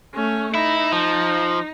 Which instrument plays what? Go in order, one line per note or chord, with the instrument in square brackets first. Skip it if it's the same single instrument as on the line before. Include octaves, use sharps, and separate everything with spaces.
[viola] A3 C#4
[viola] D#4 [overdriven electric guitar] E4
[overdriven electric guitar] F3